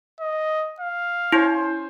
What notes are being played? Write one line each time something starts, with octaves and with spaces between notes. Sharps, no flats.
D#5
F5
C#4 E4 C5